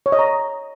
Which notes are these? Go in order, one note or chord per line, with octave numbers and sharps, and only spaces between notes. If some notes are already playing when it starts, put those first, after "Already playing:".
C#5
D#5
A#5